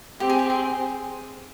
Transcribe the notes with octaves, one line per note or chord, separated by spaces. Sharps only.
C4 G4
G#4
G4
G#4